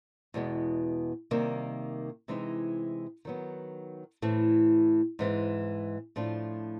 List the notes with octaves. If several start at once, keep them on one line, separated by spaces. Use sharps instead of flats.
E2 B2 G#3 B3
C3 D#3 G3 A#3
C3 E3 G#3 C4 D#4
D#3 F#3 B3
A2 E3 A3 C4 E4
G#2 E3 G#3 C4
A2 F3 A3 D4 F4